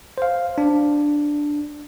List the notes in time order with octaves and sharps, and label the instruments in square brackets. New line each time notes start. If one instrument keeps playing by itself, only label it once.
[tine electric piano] C5 F5
D4